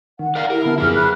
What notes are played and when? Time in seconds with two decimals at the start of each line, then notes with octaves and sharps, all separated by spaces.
0.19 D#3 F#5
0.35 A#4 D5 F5
0.50 E4 G4 A#4
0.65 D3 B3 A5
0.78 F#2 F3 E4 G#4 F6
0.95 F#3 B5 F#6